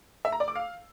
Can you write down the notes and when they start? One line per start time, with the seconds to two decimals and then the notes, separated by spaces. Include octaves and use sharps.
0.25 E5
0.32 A#5
0.40 D5
0.48 D6
0.56 F5